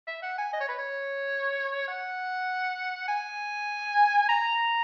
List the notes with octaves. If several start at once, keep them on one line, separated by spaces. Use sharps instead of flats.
E5
F#5
G#5
D#5
C#5
B4
C#5
F#5
G#5
A#5